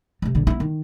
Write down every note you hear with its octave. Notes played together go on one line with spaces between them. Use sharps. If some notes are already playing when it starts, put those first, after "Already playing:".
C3 A3
A#1 D3
B3 E4
D#3